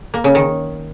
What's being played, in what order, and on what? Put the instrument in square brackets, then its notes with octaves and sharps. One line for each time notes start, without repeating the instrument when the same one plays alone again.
[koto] A#3
C#3
D#3